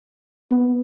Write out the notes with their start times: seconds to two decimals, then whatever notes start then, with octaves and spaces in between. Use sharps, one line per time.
0.51 B3